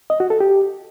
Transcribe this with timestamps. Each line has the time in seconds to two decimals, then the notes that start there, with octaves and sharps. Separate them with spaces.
0.10 D#5
0.20 F#4
0.30 A4
0.40 G4